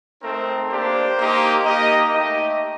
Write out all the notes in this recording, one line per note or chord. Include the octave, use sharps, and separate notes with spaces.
A3 C4 D#4 A#4
A#3 D4 G4 C5
A#3 D#4 G4
A#3 D#4 G4 D#5
A3 D#4 G4 D#5